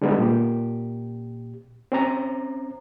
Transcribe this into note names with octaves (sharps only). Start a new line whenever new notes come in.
D3 G3 G#3 B3 D#4
A#2 G4
C4 C#4 A#5